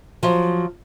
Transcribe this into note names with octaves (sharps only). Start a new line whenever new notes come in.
F3 F#3